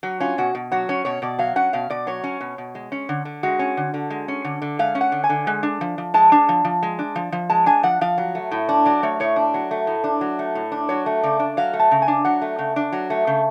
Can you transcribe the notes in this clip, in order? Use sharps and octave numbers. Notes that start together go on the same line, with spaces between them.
F#3 F#4
C#4 F4
B2 F#4
B2
F#3 F#4
C#4 C#5
B2 C#5
B2 D5
F#3 F5
C#4 F#5
B2 F5
B2 D5
F#3 C#5
C#4
B2
B2
G#3
C#4
D3
D3
G#3 F#4
C#4
D3
D3
G#3
C#4
D3
D3
G#3 F5
C#4
F#5
D3
G#5
D3
G#3
D4
F3
F3
G#3 A5
D4
F3
F3
G#3
D4
F3
F3
G#3 A5
D4 G#5
F3 F#5
F3 F5
F#3
A3
A2
D4
F#3 D5
A3 C#5
A2 C#5
D4
F#3
A3
A2
D4
F#3
A3
A2
D4
F#3 C#5
A3
C#3 D5
D4
F#3 F5
A3
A5
C#3
G#5
D4
F#3 F#5
A3
C#3
D4
F#3
A3
C#3